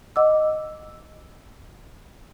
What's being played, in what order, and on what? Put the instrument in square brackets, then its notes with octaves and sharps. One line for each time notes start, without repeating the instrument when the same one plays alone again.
[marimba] D#5 F#5 D6 E6